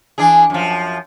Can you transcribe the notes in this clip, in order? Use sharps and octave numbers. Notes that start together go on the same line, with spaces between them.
E3 D4 G#4
F#2 F3